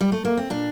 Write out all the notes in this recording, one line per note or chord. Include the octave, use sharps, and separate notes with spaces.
G3
A3
A#3
C4
A#2 D4